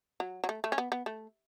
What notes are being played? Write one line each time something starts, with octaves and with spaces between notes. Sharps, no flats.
F#3
F#3
A3
A3
C#4
B3
B3
A3